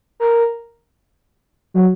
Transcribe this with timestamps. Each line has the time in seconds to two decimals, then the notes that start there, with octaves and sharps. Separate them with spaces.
0.20 A#4
1.74 F#3